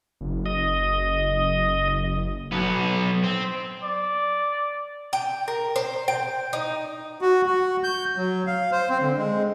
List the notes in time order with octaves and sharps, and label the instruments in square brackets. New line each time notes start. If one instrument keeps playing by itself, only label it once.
[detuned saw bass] F#1
[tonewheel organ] D#5
[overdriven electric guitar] B1 B3
C4
[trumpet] D5
[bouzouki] G5
A#4
C5
G5
D#4
[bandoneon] F#4
F#4
G6
F#3
F5
C5
C4
D3
G#3